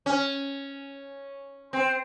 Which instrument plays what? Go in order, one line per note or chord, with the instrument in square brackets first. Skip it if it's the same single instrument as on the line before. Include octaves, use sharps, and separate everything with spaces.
[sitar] C#4
C4